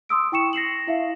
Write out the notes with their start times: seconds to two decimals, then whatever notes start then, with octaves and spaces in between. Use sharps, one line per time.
0.09 C6 D#6 E6 D7
0.32 E4 G5 C#6 C#7 E7
0.53 A#6 C7 E7 F#7
0.88 E4 E5 F5